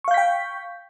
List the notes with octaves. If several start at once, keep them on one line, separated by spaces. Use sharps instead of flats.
F5 G5 C#6 G6 B6